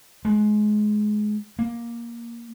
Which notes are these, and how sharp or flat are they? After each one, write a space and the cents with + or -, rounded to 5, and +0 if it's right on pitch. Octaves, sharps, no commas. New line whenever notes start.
G#3 +25
A#3 +10